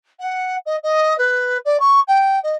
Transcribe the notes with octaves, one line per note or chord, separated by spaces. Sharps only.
F#5
D#5
D#5
B4
D5
C#6
G5
D#5